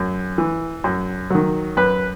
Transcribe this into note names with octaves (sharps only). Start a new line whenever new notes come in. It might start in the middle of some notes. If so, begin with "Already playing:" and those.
Already playing: F#2
E3
F#2
D#3 F#3
F#2 B4